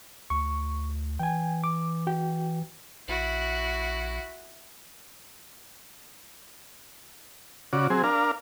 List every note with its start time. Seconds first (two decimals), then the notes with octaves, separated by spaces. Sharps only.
0.30 D2 C#6
1.19 E3 G5 G#5
1.64 D6
2.07 F#4 G5
3.08 A#1 E4 F#4
7.73 C#3 F#4 D5
7.90 F#3 C4 G#4
8.03 D4 A#4 F5